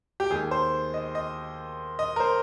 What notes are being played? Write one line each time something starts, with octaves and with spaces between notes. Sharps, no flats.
G4
D#2 D#3 G#3 G#4
C5
D#5
D#5
D#5
A#4
C5